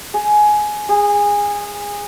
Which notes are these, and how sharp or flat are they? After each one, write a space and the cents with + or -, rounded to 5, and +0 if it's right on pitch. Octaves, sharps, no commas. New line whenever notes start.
G#4 +15
G#4 -20